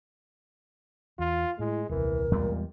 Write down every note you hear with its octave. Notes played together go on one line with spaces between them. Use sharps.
E2 F4
A2 G#3 E4
D#1 C2 E3 A#4
E2 A#2 G3 G#3